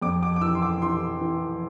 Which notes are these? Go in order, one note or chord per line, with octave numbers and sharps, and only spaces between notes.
F2 D6
D6
D6
E3 E6
C6
D6
E3 C6
E3